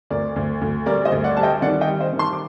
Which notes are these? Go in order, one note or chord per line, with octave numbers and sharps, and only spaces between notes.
D2 A#4 D5
D2
D2
G3 A#4 D5
C5 D#5
D2
D5 F#5
G3 A5
D#5 G5
D#3 D5 F#5
D#5 G5
G3
C5 D#5
D#3
A5 C6
D6